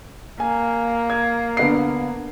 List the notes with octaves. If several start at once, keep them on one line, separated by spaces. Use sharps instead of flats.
A#3 G#5
G#6
D3 B3 C7